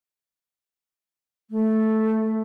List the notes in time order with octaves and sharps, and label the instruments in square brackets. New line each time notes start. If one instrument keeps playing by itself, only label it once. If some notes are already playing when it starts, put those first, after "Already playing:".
[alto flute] A3